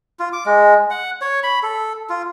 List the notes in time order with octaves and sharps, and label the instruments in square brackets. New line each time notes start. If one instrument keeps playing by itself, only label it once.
[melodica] F4
D6
G#3
F#5
C#5
B5
A4
F4